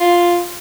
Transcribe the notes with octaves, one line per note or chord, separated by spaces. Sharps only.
F4